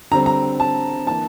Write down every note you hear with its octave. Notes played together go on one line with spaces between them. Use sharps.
D3 G3 C4 A#5
A#5
A5
E3 A#3 D4 A5